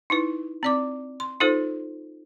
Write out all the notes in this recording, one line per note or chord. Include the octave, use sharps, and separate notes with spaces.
D#4 E4 B4
C4 D5 D6
C6
D#4 F4 A4 C5